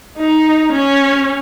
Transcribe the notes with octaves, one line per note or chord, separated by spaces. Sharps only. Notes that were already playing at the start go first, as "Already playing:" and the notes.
D#4
C#4